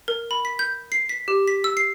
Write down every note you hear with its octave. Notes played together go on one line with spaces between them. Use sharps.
A#4
B5
B6
G6
C7
B6
G4
B6
E6
C7